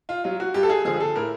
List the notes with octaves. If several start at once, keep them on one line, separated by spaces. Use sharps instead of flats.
F4
F#3 F4
F#4
G2 G4
A4
G#4
D3 F3 G#4
G#4
A4
A2 A#4